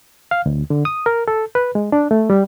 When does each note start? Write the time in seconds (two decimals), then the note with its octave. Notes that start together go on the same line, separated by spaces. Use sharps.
0.31 F5
0.46 D2
0.70 D3
0.85 D#6
1.06 A#4
1.28 A4
1.55 B4
1.75 G#3
1.92 D4
2.11 A3
2.30 G3